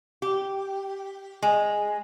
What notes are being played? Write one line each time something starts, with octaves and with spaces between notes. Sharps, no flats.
G4
G#3